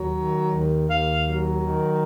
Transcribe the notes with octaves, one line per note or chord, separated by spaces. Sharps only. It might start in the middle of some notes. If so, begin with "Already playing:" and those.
Already playing: D#2 F#3
D#3
D#2
D#2 F5
F#3
D#3